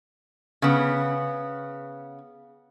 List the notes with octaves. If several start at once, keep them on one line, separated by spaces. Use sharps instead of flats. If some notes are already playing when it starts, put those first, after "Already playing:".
C#3 B3